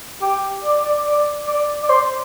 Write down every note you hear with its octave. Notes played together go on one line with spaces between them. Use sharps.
G4
D5
D5
D5
D5
D5
C5